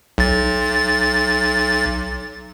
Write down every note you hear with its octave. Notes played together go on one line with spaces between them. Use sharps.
B1 A6